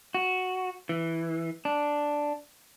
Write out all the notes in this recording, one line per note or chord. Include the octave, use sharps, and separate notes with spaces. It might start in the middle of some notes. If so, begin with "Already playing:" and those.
F#4
E3
D4